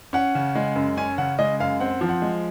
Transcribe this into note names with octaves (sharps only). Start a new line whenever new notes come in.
C#4 F#5
C#3
G#3
F#2
C#4 G#5
C#3 F#5
G#3 D#5
F#2 F5
C4 F#5
F3
F#5
G#3